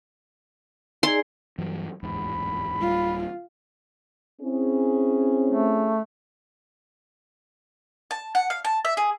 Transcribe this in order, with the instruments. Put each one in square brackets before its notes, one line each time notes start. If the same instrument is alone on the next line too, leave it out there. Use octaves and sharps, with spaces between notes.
[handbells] D#4 [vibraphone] G#4 D5 G#5 [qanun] C6
[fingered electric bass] G2 E3 F#3
[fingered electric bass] D1 E2 G#2 [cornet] B5
[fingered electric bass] D1 G3 [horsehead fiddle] F4
[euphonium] C4 [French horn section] C#4 E4 G#4
[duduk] A3
[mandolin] A5
F#5
F5
A5
E5
G#4